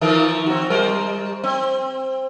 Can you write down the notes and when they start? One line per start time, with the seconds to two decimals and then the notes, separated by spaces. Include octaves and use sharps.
0.01 D#3 F3 A#4
0.46 C4 F#4
0.70 G3 A#4 C5
1.44 C4